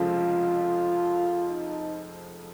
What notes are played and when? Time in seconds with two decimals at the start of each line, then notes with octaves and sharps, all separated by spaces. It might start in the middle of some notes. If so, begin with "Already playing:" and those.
Already playing: F1 F2 C#3 F3 G#3 F4
1.50 D#4